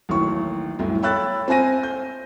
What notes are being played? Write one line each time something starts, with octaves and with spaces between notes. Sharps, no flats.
A1 D#2 F#3 C#6
C2 F#2 A2 F#3
C#5 G5 B5 E6 F#6 A6
C4 C5 G#5 A#6 D#7
G6